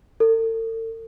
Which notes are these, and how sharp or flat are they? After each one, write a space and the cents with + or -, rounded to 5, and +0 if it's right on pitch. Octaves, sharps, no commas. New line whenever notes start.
A4 +40